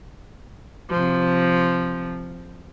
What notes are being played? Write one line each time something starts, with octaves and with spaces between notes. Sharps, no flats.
C3 F3